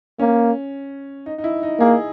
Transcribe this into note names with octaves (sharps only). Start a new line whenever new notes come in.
A#3 C#4
D#4
D#4
E4
D#4
A#3 G#4